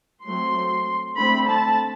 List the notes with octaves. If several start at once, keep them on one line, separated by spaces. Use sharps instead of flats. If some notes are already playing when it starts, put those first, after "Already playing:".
F#3 A3 C4 C6
D3 A3 C4 B5
A5